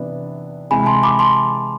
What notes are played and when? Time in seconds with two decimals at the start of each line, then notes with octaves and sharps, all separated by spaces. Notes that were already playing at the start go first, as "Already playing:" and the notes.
Already playing: C3 E3 B3 D4
0.71 C3 E3 G#3 G#5 B5
0.86 A5 C6
1.03 B5 D6
1.19 A5 C6